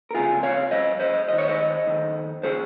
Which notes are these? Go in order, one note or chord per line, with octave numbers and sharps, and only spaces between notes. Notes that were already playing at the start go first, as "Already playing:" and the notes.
A#4
C#2 C3 F3 F4 G#4
C#5 F5
G2 F3 C5 D#5
C5 D#5
D#2 D#3 D#5
C#5
C5 D#5
F2 D#3
C#3 F3 G#4 C5